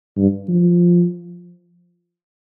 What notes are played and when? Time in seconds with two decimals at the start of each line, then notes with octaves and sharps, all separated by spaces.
0.17 G2
0.49 F3